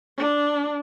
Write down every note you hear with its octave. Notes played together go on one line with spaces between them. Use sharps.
D4